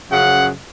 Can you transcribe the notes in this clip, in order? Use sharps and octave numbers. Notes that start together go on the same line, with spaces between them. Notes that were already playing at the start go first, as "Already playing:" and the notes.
F#2 C#3 F3 F#5